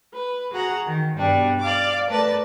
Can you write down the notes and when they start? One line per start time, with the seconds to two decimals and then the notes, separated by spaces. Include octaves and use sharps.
0.13 B4
0.51 F#4 G#4 F#5 A#5
0.87 D#3
1.17 G2 B2 G3 D4
1.60 D5 F5 D6
2.09 A3 A#4 B4 D5 A5